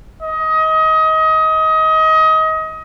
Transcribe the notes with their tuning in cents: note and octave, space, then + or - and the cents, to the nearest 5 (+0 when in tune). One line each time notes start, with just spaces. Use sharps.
D#5 +25